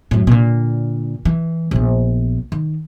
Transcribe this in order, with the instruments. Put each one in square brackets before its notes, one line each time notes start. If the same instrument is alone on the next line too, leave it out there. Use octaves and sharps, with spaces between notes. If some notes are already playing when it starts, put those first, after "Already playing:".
[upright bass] F#2 A2
A#2 D3
E3
A#1 B3
D#3